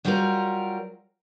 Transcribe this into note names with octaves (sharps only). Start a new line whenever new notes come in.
F#3 G3 F4 F#4 G#4 A#4